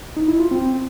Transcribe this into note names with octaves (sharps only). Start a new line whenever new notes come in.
D#4
E4
F4
C4